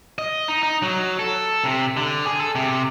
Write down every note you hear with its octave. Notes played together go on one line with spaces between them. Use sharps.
D#5
D#4
D#4
F#3
A4
C3
D3
G#4
A4
C3